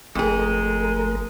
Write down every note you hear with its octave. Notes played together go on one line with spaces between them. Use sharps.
G1 F2 G#3 A3 G#4 A#4